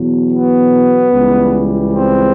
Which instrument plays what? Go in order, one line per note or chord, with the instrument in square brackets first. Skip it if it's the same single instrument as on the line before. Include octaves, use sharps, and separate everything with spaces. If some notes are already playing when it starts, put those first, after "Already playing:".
Already playing: [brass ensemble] E2 B2 F#3
B3
C#2 C#3 E3 G3
C4